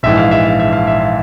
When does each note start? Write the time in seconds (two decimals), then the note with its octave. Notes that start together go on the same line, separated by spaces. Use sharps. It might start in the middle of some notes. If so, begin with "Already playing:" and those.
0.03 A#1 G#2 E3 E5
0.17 F5
0.31 E5
0.45 F5
0.59 E5
0.73 F5
0.87 E5
1.01 F5